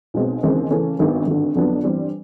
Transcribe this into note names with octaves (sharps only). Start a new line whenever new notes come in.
B1 B2 G#3 C4
D#2 C#3 E3 G#3 C4
C#3 E3 A3 C#4
G#1 G2 D#3 G#3 B3
G#1 G2 D3
F2 D3 F#3 B3 D4
G2 E3 G3 C4